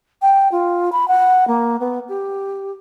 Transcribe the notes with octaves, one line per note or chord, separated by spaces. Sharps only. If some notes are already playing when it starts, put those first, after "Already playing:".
G5
F4
B5
F#5
A#3
B3
G4